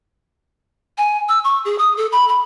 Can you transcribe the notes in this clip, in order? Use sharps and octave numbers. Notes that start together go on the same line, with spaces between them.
G#5
E6
C#6
G#4
D#6
A4
B5
B5